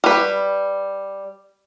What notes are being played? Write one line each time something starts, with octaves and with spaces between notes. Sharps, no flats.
G3 B4